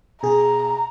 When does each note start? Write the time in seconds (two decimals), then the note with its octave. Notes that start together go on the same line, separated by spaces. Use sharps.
0.23 B2 G#4 A#5